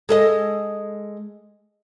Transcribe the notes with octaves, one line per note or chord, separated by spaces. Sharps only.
G#3 A4 D#5